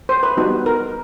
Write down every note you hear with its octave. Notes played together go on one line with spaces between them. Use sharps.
C5
B4
G3 B3 D#4 F#4
A#4